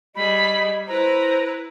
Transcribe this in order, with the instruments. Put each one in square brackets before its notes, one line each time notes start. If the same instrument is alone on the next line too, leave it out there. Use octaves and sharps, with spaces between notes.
[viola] G3 G#4 [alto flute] D#5 [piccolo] B5
[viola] E4 B4 [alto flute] C5 [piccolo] A#5